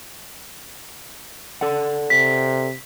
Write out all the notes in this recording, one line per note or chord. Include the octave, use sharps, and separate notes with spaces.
A4 D5 F#5
C3 B6